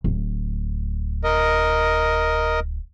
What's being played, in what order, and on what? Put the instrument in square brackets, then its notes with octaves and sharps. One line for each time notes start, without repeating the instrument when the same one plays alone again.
[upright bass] D1
[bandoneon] A#4 D#5